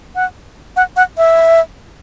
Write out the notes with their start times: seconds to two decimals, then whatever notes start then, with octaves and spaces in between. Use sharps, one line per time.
0.15 F#5
0.76 F#5
0.97 F#5
1.18 E5